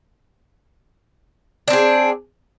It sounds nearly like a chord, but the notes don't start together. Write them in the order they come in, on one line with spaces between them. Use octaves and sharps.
D4 C4 G#4